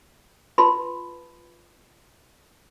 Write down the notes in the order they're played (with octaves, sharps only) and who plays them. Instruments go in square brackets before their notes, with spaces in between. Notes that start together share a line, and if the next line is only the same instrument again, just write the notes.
[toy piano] F4 B4 A5 B5 C6